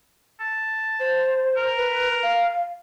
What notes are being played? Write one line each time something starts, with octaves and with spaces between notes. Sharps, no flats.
A5
C5
A#4
B4
F5